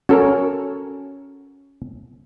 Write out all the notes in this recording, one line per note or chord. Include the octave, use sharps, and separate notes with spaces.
C#4 F#4 A4 A#4